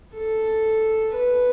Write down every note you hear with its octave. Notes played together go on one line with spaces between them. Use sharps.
A4
B4